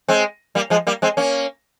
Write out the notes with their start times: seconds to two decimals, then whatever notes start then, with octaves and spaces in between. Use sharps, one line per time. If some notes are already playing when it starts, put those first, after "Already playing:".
0.09 G#3 C4
0.55 G3 A#3
0.70 F3 G#3
0.87 G3 A#3
1.02 G#3 C4
1.17 A#3 C#4